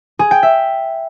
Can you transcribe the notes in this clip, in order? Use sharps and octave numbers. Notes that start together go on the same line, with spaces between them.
G#4
G5
E5